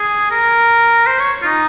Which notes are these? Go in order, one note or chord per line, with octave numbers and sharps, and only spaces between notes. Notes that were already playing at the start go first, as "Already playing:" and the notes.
Already playing: G#4
A#4
C5
C#5
F4
D#4